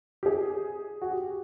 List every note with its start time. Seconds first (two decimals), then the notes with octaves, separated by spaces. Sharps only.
0.23 G4
0.26 G#4
1.02 F#4
1.11 G4